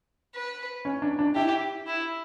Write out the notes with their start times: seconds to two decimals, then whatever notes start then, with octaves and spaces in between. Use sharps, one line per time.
0.35 B4
0.85 C#4
1.02 D4
1.19 D4
1.35 E4 G4
1.87 E4